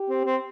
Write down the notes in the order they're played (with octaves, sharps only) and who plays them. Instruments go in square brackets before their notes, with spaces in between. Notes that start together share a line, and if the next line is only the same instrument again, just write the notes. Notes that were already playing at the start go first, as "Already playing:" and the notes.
Already playing: [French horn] G4
[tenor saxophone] C4
C4